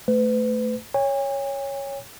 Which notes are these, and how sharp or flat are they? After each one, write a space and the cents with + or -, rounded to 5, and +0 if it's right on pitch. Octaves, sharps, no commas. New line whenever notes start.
A3 +0 B4 +35
C#5 +0 G#5 -45